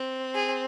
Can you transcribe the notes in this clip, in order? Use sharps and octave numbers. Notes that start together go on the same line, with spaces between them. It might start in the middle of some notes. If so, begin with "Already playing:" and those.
Already playing: C4
G#4